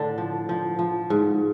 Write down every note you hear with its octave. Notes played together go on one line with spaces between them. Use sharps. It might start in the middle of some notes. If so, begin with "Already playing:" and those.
Already playing: A2 D3 D4
F3
F3
F3
G#2